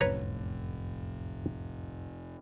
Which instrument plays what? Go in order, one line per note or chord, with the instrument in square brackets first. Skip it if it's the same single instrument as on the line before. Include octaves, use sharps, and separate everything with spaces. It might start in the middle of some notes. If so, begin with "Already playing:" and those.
[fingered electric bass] F1 [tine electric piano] C2 F#2 A2 [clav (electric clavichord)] B4 C#5 A#5